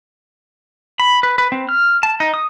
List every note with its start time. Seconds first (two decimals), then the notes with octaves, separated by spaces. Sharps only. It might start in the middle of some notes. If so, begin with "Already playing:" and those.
1.00 B5
1.23 B4
1.38 B4
1.52 C4
1.69 F6
2.03 A5
2.20 D#4
2.34 D#6